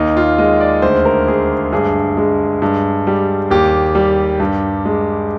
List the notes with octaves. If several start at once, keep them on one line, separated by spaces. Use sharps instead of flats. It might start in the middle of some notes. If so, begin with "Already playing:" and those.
Already playing: D#2 D#4
F4
G#3 D#5
D5
D2 C5
A#4
G#3 G#4
G2 G#4
G#3
G2
G3
D#2 G4
G3
G2
G#3